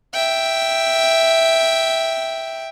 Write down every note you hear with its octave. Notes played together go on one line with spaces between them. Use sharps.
E5 G5